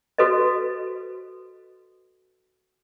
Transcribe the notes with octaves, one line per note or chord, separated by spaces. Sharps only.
F#4 A4 B4 C5 D#5